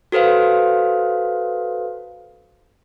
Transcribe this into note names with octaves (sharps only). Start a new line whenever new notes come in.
F#4 A4 B4 C5 F5